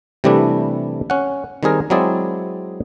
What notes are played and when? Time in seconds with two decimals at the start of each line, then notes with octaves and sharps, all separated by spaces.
0.24 C3 E3 G3 A3 D4 E4
1.10 C#4 F#5
1.63 D#3 G3 C4 G#4 A#4
1.90 F#3 G#3 C4 E4 G#4 D5